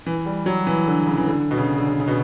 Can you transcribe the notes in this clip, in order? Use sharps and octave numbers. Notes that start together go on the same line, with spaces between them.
E3
G3
F#3
E3
D3
C#3
E3
D3
B2
C#3
D3
C#3
C#3
B2